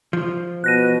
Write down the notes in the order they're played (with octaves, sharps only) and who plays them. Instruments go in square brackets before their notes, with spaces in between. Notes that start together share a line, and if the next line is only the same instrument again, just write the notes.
[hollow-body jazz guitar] F3
[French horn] B2 [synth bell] F#6 A#6 D#7